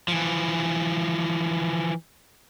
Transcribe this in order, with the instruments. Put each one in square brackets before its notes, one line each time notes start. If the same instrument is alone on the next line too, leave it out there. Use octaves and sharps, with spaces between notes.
[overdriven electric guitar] E3 F3